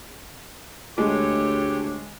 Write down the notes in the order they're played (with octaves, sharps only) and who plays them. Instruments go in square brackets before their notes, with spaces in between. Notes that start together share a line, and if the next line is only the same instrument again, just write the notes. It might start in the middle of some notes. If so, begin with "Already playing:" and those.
[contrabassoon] D2 [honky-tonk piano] G#3 [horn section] A3 A4 C#5 [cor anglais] G4